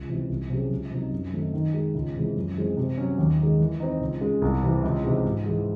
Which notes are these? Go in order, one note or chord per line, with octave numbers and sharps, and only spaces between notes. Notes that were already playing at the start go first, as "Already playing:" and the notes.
Already playing: C#2
C3 E3
C2
C3 F#3 C#4 G#4
C#2
C3 F#3 C4 D#4
F#2
D#3 A3 C4 D#4
D#3
G#3 D#4
C#2
C3 E3 G#3
F#2
E3 G#3 C4
C3
F#3 C#4
D#2
D#3 G#3
E3
C4 D#4
C#2
C#3 G#3
C2
C3 E3
C#2
C3 E3 G#3 D#4
G#2
E3 G#3